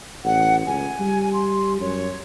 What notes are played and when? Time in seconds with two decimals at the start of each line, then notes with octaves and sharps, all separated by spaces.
0.24 A1 F#5
0.66 C#2 G#5
1.00 G3
1.33 C6
1.80 F#2 C#5